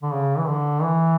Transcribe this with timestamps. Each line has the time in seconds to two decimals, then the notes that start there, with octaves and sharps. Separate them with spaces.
0.02 D3
0.12 C#3
0.38 E3
0.48 D3
0.82 E3